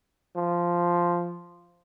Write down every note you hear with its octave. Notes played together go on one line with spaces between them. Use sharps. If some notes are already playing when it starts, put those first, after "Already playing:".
F3